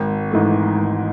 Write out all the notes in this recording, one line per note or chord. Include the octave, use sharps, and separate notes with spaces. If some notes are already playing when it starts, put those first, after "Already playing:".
Already playing: G#1
G#2 E3 A3
G#1